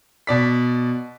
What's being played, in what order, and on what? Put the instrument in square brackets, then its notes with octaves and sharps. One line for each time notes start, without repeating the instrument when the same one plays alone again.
[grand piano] B2 D5 B6